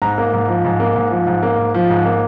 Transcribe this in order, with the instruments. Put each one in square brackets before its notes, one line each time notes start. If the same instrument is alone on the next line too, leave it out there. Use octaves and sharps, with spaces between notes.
[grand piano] G#2 A#5
A#3
G#2
F3
G#2
A#3
G#2
F3
G#2
A#3
G#2
F3
G#2
A#3